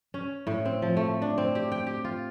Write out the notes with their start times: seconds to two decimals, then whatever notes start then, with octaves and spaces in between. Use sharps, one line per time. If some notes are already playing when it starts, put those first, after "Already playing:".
0.14 C#4
0.47 A2
0.65 C4
0.82 F3
0.96 A3
1.22 D4
1.38 C4
1.55 G4
1.72 G5
1.87 G4
2.04 F4